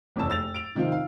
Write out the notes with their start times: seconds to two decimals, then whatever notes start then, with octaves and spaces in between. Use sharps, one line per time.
0.16 F#1 E2 C3 C#5 A5 E6
0.28 F1 E6 A6 F7
0.54 D7 F7
0.75 C3 D#3 F3 C4 F4
0.92 F5